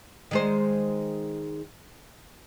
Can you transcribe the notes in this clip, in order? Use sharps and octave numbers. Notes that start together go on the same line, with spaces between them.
D#3 G#3 C5